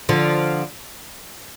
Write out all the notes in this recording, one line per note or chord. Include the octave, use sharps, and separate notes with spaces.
D3 F3